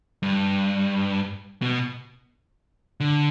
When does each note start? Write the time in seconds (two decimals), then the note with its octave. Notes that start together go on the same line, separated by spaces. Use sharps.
0.23 G2
1.62 B2
3.00 D3